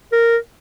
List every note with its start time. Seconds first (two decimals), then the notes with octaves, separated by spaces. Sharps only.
0.12 A#4